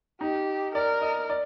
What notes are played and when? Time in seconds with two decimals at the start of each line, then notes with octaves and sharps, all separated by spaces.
0.21 D#4 G4
0.75 A#4 D5
1.02 D#5
1.30 D5